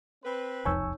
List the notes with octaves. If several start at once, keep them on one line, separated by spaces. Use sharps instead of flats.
C4 B4
E1 C2 F2 D#4 C#5 G#5 C#6 E6